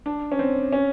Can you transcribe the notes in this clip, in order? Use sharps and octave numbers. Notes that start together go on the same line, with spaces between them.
D4
C#4
C4
C#4